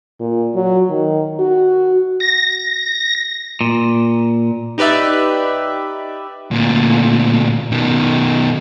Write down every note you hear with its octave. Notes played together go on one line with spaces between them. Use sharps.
A#2
F#3
D#3
F#4
A#6
A#2
D#4 G4 B4 D5 E5
D2 A#2
B2 D#3